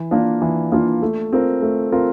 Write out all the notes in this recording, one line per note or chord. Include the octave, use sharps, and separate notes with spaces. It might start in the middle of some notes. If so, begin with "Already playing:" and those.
Already playing: E3
A#3 D4 F4
E3
A#3 D4 F4
A3
C4 F4 A#4
A3
C4 F4 A#4